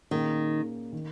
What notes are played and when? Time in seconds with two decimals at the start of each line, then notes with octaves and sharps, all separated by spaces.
0.11 A#2 D#3 A#3 C#4 G#4
0.92 D#3